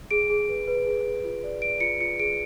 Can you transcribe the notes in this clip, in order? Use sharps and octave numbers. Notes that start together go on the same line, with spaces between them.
G#4 D7
G#4
B4
B4
G#4
G#4
F4
D5
D5 D7
F4 C#7
F4 C#7
G#4 D7